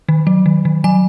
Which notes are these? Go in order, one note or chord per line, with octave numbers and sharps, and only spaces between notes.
D#3
F#3
D#3
D#3
F#3 G#5